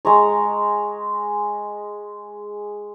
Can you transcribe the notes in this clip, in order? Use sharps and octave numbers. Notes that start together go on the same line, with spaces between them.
G#3 A#5 C#6